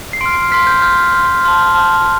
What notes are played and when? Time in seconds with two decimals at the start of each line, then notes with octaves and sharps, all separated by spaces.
0.13 C7
0.21 C6 F6 D7
0.36 C7
0.52 C6 F6 B6
0.67 G6
0.82 C6 F6 G6
1.12 C6 F6
1.44 A5 C6 F6
1.74 A5 C6 F6